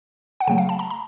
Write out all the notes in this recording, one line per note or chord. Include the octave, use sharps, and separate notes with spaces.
F#5
C#3 F#3 A3 G5
F5
A5
A#5
A#5